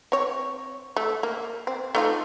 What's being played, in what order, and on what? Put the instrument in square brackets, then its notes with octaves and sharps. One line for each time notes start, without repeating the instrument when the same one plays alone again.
[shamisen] C4 C#5
A3
A#3
C4
A3 D#4 F4